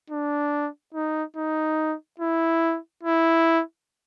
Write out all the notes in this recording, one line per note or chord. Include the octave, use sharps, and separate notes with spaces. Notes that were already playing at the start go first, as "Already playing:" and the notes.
D4
D#4
D#4
E4
E4